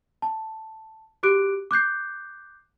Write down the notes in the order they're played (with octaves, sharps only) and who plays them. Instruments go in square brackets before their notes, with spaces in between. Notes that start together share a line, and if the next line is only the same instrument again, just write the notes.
[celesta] A5
F#4 G4 D6 F#6 D7
D6 F#6 G6 C7